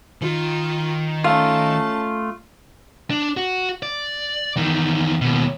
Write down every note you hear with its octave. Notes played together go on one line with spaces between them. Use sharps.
D#3 F4
A3 C#4 F4 F5 A5
D4
F#4
D5
E2 D#3
D#2 B2